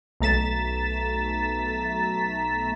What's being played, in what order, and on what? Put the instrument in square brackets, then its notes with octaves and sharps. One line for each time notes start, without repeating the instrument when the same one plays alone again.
[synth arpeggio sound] B1 A3 A#5 A6 B6 E7